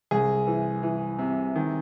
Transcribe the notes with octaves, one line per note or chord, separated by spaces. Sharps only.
C2 G#4
E3
E3
C3
D#3